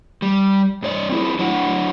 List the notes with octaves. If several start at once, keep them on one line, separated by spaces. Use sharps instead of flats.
G3
G2 C#5 D5
C4 C#4 E4 G#4
F#3 D4 E4 C#5 F#5